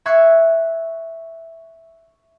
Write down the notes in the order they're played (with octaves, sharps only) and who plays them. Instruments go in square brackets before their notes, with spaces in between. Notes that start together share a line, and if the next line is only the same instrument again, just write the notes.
[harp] E5 C#6 F#6 G#6 C7